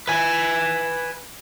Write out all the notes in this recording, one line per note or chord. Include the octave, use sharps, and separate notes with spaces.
B4 G#5